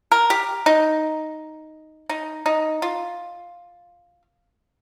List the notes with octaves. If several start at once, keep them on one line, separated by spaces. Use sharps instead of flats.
A#4
G4
D#4
D#4
D#4
F4